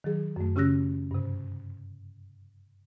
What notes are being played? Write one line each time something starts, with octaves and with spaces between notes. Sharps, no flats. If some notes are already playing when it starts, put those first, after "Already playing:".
D#3 F#3 G#4
F#2 A3
C#3 C#4 G4 E6 F#6 A#6
G2 C3